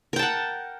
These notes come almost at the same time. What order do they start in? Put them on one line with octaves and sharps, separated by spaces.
A#4 G5 A5 F#5